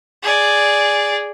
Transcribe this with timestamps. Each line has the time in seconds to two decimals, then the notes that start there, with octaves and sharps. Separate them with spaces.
0.23 G#4 D5